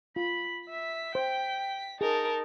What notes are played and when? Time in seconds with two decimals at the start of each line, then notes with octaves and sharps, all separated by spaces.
0.16 F4 B5
0.69 E5 B6
1.15 C5 G5
2.01 D#4 G#4 A#4 A5